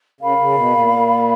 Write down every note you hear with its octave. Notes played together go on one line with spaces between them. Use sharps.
C#3 A#4 F5 B5
C#3
B2
A#2